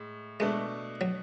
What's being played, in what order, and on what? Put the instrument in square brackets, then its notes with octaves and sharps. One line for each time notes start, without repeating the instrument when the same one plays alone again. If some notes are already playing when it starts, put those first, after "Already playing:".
Already playing: [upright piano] A2 G#3
[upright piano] B2 A3 D4 [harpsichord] G#3
[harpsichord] F#3